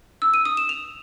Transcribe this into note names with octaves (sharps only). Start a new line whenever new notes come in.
E6
D#7
D#6
E7
F7